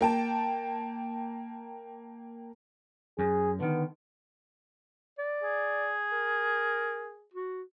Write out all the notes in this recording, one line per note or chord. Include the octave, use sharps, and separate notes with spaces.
A#3 G5 A5
F#2 G#4
D3 D#3 B3
D5
G#4
A#4
F#4